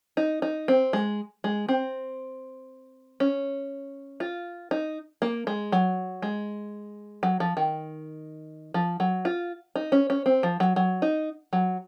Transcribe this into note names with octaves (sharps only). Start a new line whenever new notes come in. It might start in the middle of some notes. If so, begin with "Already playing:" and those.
D#4
D#4
C4
G#3
G#3
C4
C#4
F4
D#4
A#3
G#3
F#3
G#3
F#3
F3
D#3
F3
F#3
F4
D#4
C#4
C#4
C4
F3
F#3
F#3
D#4
F#3